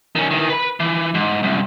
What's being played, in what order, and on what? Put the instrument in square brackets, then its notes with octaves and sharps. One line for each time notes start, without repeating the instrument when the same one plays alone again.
[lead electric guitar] D#3 C#4
D#3 E3
B4 B5
E3
G#2
C2 F#2